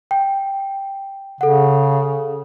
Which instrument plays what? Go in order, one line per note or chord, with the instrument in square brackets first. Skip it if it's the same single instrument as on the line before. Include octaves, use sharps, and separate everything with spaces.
[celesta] G5
[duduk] C#3 [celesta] A4 F#5